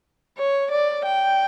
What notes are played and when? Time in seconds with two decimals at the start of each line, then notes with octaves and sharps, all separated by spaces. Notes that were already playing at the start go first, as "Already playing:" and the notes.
0.38 C#5
0.72 D5
1.05 G5